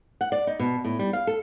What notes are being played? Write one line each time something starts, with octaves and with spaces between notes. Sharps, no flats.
F#5
D5
D#4
B2
A2
G3
F5
A4